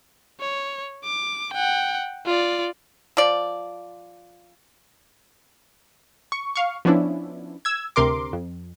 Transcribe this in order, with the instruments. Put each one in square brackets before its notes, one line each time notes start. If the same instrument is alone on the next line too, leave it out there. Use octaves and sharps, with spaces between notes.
[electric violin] C#5
D6
F#5 G5
F4 D5
[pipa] F3 D5
[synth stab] C#6
F5 C#6
F3 B3 C#4 D4 E4
E6 G#6
D2 C3 A#4 C6 D6
F2